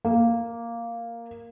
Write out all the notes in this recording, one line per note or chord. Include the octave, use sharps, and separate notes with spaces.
A#3